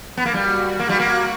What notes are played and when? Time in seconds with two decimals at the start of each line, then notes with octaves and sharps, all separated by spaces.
0.17 B3
0.26 A#3
0.34 G3 F#4
0.80 A#3
0.89 G3
1.00 A#3